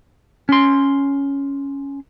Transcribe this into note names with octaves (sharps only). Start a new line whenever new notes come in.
C#4 C6